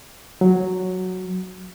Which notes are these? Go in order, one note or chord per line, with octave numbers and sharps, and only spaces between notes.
F#3